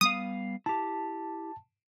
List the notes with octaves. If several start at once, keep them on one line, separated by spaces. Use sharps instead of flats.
G3 B3 F5 D#6
E4 G4 A5